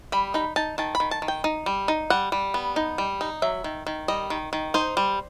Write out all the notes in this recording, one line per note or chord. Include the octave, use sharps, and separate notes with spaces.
G3 B5
D#4 B5
D#4 A5
D#3 A5
B5
D#3
A5
D#3
G5
D#4
G3
D#4
G3 F#5
G3
B3
D#4
G3
D#4
F#3 E5
D#3
D#3
G3 D#5
D#3
D#3
D#4 C5
G3